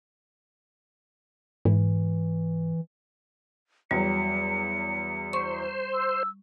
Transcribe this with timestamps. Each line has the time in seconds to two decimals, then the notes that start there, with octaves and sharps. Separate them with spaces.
1.65 G#2 E3
3.91 E2 F#3 G3 C#7
5.33 C5 C#6
5.94 E6